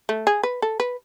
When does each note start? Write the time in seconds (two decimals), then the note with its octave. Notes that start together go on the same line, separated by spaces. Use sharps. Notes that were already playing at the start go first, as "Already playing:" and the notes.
0.09 A3
0.27 G#4
0.43 B4
0.62 A4
0.80 B4